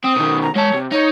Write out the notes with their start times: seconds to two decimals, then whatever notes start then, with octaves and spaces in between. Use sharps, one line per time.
0.04 C4 D#6
0.16 B2 D#3
0.42 A#5
0.55 G#3 C#5 A5
0.73 C3
0.92 D#4 C#5